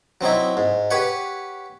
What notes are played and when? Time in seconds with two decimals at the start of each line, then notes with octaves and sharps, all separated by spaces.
0.21 F#3 C4 D#4 E4
0.57 G#2
0.91 G4 B4 C#5 F#5